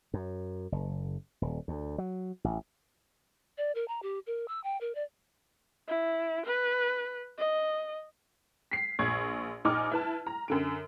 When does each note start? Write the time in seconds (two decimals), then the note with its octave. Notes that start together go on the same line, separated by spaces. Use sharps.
0.14 F#2
0.72 F#1
1.42 D#1
1.68 D2
1.98 F#3
2.44 A1
3.57 D5
3.75 A#4
3.88 A#5
4.03 G4
4.27 A#4
4.48 E6
4.64 G5
4.81 A#4
4.95 D5
5.88 E4
6.46 B4
7.38 D#5
8.71 B6 C7
8.99 A#1 C#6 G#6
9.65 A#1 D#4 G#5 D6 F6
9.92 E4 B4 A5
10.27 A#5
10.48 F#2 D3 D7